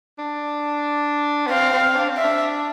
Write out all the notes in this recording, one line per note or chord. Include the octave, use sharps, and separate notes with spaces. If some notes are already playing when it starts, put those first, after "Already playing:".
D4
B3
C4 F5
C4
D4
C4
E5
D4